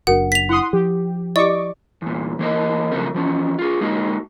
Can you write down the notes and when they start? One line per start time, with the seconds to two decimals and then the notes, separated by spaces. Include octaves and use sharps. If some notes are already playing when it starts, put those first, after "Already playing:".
0.07 F#1 F#2 D4 F#4 A#4 F#5
0.32 B6 F7
0.49 E4 F#5 C6 D#6
0.73 F3 G4
1.36 E4 G4 D5 D#5 C#6 D6
2.02 E2 A#2
2.39 E3 A#3 A#4 D#5
2.92 C#3 F3 F#3 A3 C4 A#4
3.14 E3 F3 C#4
3.59 F4 G#4
3.81 G#3 A#3 D#4 F#4